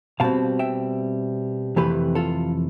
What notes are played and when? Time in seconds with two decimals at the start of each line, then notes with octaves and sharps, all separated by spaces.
0.20 B2 G3 C4 F5 A5
0.59 E5 G5
1.76 F2 C3 E3 A3 G4 B4
2.15 F4 A4